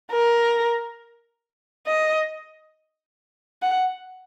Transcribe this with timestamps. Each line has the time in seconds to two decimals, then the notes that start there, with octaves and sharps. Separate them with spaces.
0.12 A#4
1.87 D#5
3.62 F#5